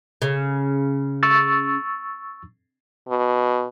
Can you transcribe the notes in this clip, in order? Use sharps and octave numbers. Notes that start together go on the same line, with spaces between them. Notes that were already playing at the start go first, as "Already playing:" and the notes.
C#3
C#6 E6 A6
B2